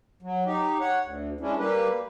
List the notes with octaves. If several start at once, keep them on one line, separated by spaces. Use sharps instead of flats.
F#3
D#4 G4
C#5 F#5
D2
G#3 C#4 D4 E4
G3 A#3 G4 B4